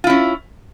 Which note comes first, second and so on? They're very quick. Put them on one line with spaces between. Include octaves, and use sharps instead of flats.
F4 E4 C#4